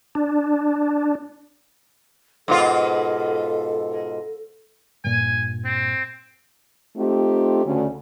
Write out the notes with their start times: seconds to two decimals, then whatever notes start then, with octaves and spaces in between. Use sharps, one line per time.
0.15 D4
2.48 G#2 B2 F4 A4
5.04 G2 A#2 G#5
5.65 C4
6.97 A3 C4 D#4 F4 G4
7.65 D2 C#3